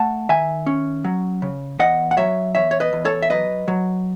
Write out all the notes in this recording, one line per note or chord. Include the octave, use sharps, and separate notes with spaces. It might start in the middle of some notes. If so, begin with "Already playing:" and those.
Already playing: A3 F#5 A5
D#3 E5 G#5
C#4
F#3
C#3
E2 D#5 F#5
F#5
F#3 C#5 E5
E2 C#5 E5
C#5
B4 D#5
E2
A4 C#5
E5
F#3 B4 D#5
F#3